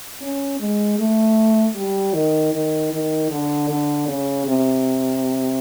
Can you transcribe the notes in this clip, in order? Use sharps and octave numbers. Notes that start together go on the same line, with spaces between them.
C#4
G#3
A3
G3
D#3
D#3
D#3
D3
D3
C#3
C3